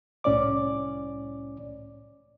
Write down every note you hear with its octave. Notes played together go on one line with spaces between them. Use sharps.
C2 A2 C#4 C#5 D5 D6